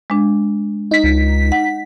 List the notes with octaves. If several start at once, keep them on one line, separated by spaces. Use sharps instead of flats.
G#3 D4
D#4 B6
C#2
F#5